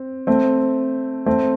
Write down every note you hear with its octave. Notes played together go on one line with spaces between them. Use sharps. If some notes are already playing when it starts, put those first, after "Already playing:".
Already playing: C4
A3 C4
A3 C4